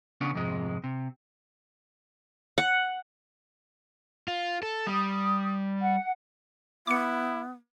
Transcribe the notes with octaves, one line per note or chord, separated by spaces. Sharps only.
C#3 B3 C#4 D4
F2 G#2 C3 G#3
C3
F#5
F4
A4
G3 D#6
F#5
B3 E4 D6 C#7